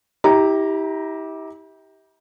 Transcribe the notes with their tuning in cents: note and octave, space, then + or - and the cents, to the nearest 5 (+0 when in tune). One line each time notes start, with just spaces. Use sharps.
E4 -40 G4 +0 A#5 +0